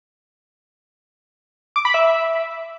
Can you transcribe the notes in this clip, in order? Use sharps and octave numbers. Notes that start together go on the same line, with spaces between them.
D6
B5
E5